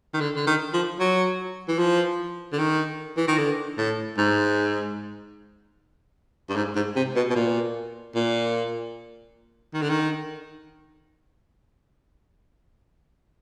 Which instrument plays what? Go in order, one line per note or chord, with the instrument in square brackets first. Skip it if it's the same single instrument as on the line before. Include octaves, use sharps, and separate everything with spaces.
[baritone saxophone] D#3
D3
D3
D#3
F3
F#3
E3
F3
D3
D#3
E3
D#3
D3
A2
G#2
G2
G#2
G#2
C3
B2
B2
A#2
A#2
D#3
D3
D#3